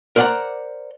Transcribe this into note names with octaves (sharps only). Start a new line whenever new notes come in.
A#4 C5 D5 F5 F#5 A#5